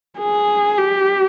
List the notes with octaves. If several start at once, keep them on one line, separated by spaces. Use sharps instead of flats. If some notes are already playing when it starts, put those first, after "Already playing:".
G#4
G4